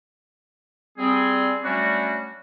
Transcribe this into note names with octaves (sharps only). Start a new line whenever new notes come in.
G3 C4 G#4
F#3 G3 A3 C#4 D4 F#4